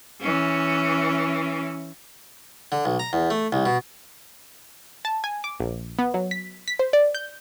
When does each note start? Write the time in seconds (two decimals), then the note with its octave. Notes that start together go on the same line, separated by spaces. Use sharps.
0.21 E3 C#4
2.72 D3
2.85 B1
2.99 A#5
3.13 E2
3.30 A3
3.52 C2
3.66 B2
5.05 A5
5.24 G#5
5.44 D6
5.60 A#1
5.99 B3
6.14 F#3
6.31 B6
6.68 B6
6.79 C5
6.93 D5
7.15 G6